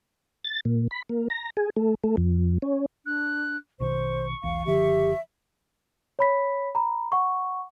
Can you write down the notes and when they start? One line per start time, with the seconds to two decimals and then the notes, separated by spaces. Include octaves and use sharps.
0.44 A6
0.65 A#2
0.91 B5
1.09 A#3
1.30 A#5
1.57 G#4
1.76 A3
2.04 A3
2.17 F2
2.62 C#4
3.06 D4 F#6
3.80 A#1 B2 D#3 C5 C#6
4.43 E1 B1 E3 F5
4.66 F#1 D3 F3 G4 E5
6.19 C#5 B5 B6
6.75 A#5 B5
7.12 F#5 C#6